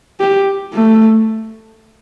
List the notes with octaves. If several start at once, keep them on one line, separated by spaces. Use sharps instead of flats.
G4
A3